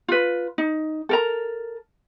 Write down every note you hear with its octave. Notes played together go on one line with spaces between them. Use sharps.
F4 B4
D#4
A4 A#4 A#5